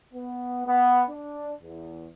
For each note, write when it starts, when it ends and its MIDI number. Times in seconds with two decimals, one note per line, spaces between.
0.13 0.64 59
0.66 1.02 59
1.09 1.53 62
1.62 2.08 40